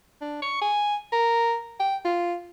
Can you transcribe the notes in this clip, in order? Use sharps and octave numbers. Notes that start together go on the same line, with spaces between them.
D4
C#6
G#5
A#4
G5
F4